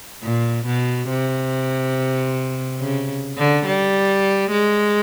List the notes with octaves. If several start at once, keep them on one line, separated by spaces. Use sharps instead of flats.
A#2
B2
C3
C#3
D3
G3
G#3